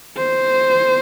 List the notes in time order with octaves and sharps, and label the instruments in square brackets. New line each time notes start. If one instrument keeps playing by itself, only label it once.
[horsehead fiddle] C5